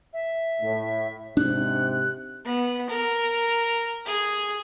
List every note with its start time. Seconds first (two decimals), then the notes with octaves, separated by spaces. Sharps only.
0.13 E5
0.61 A2
1.37 G#2 C3 D4 F#6
2.45 B3
2.90 A#4
4.06 G#4